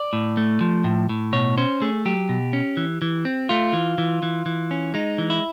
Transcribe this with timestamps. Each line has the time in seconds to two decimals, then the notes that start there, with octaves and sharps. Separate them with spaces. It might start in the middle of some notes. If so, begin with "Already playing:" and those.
Already playing: D5
0.13 A2
0.37 A3
0.61 F3
0.84 A2
1.09 A2
1.33 B2 C#5
1.58 C#4 C5
1.82 A3 G#4
2.05 F#3 G4
2.29 B2
2.53 C#4
2.77 E3
3.02 E3
3.25 C4
3.49 A3 F4
3.73 E3
3.98 E3
4.23 E3
4.46 E3
4.71 C#4
4.94 G#3 D#4
5.18 E3
5.30 E4